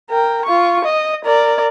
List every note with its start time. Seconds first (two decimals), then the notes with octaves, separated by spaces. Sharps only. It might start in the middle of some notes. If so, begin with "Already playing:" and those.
0.10 A#4 G5
0.45 F4 C#6
0.84 D#5
1.25 A#4 D5